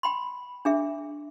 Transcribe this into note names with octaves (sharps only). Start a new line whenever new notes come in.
G5 B5 C6
D4 G#4 E5